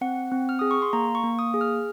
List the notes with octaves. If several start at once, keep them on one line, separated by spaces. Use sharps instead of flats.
C4 F#5
C4
F6
G#4 D#6
C#6
C6
A#3 A#5
C#6
A#3
D#6
G#4
F6